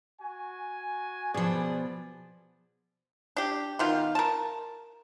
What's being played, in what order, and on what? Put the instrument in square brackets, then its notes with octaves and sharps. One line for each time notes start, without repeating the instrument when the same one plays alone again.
[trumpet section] F#4 G#5
[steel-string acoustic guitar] B2 F3 [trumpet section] B3 G#4 D5
[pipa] D4 G4
B2 D#3 F4
A#4 A5